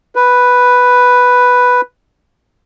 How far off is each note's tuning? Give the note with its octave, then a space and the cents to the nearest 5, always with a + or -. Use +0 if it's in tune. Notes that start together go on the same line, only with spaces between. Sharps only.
B4 +0